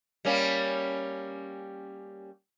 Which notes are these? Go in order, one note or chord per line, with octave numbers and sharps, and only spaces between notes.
G3 A#3 C#4